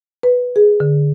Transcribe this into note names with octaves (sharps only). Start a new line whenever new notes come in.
B4
G#4
D3